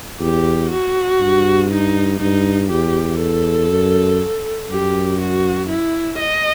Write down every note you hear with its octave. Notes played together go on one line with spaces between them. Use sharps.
E2 G4
F#4
G2
D#4
G2 D#4
E2 G4
A4
F#2
F#2 G4
F#4
E4
D#5